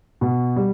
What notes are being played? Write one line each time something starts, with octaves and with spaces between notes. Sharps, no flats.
B2
G3